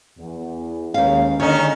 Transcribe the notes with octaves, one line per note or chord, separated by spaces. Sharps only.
E2
D#2 G#3 C#4 B4 F5
D3 D#3 C#4 D#4 C#5